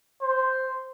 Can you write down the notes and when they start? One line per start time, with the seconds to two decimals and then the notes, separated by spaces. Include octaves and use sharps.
0.22 C5